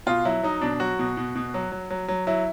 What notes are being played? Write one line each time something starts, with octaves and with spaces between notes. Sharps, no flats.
B2 F4
F#3 E4
F#3 D#4
B2 D4
F#3 F#4
B2
B2
B2
F#3
F#3
F#3
F#3
F#3 E4